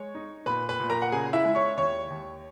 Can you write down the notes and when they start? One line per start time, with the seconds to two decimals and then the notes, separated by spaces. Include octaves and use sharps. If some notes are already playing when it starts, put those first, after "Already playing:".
Already playing: G#3 C#5
0.15 D#4
0.46 A#2 B4 B5
0.69 B4 B5
0.80 A#2
0.90 A#4 A#5
1.02 F#5
1.12 C#3 G#4 G#5
1.33 E4 E5
1.45 G#3
1.55 C#5 C#6
1.77 D#2 C#5 C#6
2.10 D#2